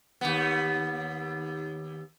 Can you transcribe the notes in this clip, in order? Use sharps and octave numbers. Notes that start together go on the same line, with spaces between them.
D#2 B3